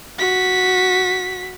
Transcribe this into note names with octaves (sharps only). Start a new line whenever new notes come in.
F#4 B6